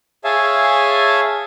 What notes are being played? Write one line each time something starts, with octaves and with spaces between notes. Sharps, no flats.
G#4 C#5 E5 F5 G#5 A5